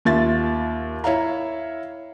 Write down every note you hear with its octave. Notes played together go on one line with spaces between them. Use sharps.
D#2 F4 E5 A6
E4 C#5 E5 F5 A#5